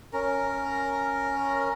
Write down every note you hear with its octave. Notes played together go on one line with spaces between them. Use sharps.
C#4 A#4